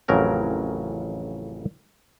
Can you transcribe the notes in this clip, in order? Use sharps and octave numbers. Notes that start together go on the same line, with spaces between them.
A1 F2 C#3 F#3 A#4 G5